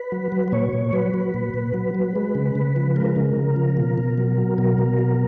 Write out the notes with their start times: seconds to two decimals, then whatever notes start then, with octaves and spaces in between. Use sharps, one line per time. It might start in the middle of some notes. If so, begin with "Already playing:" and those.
Already playing: B4
0.12 F#3
0.32 F#3
0.48 B4
0.52 A#2 C#5
0.73 A#2
0.93 F#3 B4
1.14 F#3
1.34 A#2
1.54 A#2
1.74 F#3
1.94 F#3
2.15 G#3
2.35 C#3
2.55 C#3
2.76 F3
2.96 G#3 A#4
3.16 C#3
3.37 C#3
3.56 F3
3.77 B2
3.98 B2
4.18 F#3
4.37 F#3
4.58 B2 A#4
4.78 B2
4.99 F#3